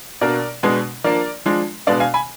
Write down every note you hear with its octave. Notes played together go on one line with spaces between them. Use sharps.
B2 A#3 D4 A#4 D5
B2 G#3 B3 D4
F3 A#3 D4 A#4 D5
F3 G#3 D4
B2 G#3 B3 D4 D5 F5
F5 G#5
G#5 B5